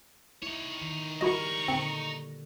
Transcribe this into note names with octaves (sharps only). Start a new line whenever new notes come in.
D#4 E4 C#5
D#3
G3 E4 F#4 A#4 D#5 A#5 C#6
A#2 D3 C4